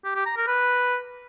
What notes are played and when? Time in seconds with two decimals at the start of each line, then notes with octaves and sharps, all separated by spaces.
0.05 G4
0.15 G4
0.26 A#5
0.37 A#4
0.47 B4